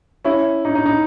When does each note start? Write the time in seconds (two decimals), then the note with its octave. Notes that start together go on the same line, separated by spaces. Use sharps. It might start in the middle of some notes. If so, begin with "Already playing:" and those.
0.24 C#4 E4
0.65 D#4
0.75 D#4
0.86 D#4